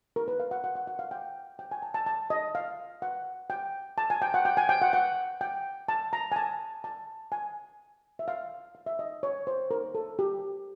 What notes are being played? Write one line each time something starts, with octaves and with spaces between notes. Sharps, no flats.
A#4
B4
F5
F#5
F#5
F#5
F#5
F5
G5
G5
G#5
A5
A5
A5
D#5
F5
F#5
G5
A5
G#5
G5
F#5
G5
G#5
G5
F#5
F#5
G5
A5
A#5
G#5
A5
A5
G#5
E5
F5
F5
E5
D#5
C#5
C5
A#4
A4
G4